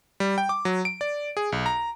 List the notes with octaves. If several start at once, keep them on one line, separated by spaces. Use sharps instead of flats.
G3
G5
D6
F#3
D7
D5
G#4
B1
A#5